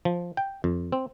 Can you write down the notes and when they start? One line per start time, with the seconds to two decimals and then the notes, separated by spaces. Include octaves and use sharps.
0.05 F3
0.37 G5
0.64 F2
0.92 C4